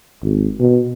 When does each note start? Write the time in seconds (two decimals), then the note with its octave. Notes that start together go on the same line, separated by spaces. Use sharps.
0.23 G#1
0.60 B2